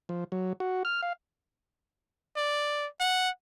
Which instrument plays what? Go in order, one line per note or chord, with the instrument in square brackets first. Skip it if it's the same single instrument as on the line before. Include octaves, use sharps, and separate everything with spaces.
[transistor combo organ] F3
F#3
F#4
F6
F5
[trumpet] D5
F#5